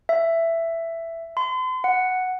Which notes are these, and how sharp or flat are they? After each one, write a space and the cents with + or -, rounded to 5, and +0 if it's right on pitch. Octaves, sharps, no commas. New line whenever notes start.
E5 +10
C6 -40
F#5 +0